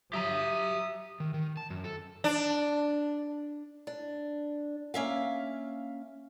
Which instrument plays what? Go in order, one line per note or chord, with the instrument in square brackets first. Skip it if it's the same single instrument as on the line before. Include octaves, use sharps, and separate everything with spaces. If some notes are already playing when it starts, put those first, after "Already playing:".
[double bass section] F#3 [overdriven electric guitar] G4 A#5 [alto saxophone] E5 [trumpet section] D#6
[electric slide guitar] D#3
D#3
A5
F#2
A4
[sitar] D4
[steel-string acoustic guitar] D4
A#3 C#4 E5 F5